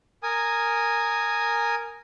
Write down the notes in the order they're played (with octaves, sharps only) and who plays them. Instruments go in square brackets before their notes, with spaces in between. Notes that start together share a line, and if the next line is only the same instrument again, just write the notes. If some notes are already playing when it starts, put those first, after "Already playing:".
[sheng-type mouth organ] A#4 G#5 D#6